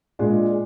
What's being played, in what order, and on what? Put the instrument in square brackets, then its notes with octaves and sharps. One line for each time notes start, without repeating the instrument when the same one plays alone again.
[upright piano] A#2 G#3 D4